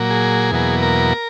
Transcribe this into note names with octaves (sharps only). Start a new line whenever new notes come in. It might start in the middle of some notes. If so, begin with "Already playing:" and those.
Already playing: A#2 F#3 A#3
G#4
E2 B2 F#3 A#3
A#4